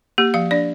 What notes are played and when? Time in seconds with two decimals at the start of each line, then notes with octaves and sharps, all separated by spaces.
0.18 A#3 G4
0.34 F3 F5
0.51 D4 D5